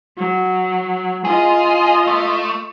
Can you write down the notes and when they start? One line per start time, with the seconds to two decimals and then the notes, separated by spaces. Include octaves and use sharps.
0.17 F#3
1.25 F4 G#4 D#5
2.07 A3